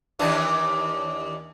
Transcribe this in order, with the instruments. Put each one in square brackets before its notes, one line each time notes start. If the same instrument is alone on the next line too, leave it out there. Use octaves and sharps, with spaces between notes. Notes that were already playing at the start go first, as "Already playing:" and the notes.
[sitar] D#2 E3 D4